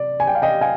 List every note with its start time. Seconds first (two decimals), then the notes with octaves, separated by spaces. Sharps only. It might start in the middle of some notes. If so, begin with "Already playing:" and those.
Already playing: C3 D5
0.20 G#5
0.27 G5
0.35 F5
0.42 D#5 G5
0.61 F5 G#5